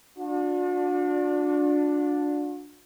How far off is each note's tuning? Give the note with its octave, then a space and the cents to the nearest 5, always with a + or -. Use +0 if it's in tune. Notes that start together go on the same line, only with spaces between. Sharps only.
D4 +0 F#4 -45